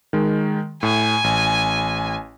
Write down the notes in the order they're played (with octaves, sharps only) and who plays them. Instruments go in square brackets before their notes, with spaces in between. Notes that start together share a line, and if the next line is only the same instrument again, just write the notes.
[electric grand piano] D#3 G#3
[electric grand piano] A2 [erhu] G#5
[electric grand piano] A1